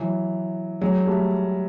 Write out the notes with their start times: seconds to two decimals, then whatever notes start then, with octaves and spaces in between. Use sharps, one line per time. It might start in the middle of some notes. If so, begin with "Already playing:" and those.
Already playing: E3 F#3
0.81 F#3 G#3
1.06 G3 A3